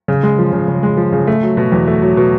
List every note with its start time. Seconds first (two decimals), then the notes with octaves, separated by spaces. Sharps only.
0.08 C#3
0.23 G#3
0.38 F3
0.53 C#3
0.68 C#3
0.83 G#3
0.97 F3
1.13 C#3
1.27 A3
1.43 F#3
1.57 B2
1.72 E2
1.87 A3
2.02 F#3
2.17 B2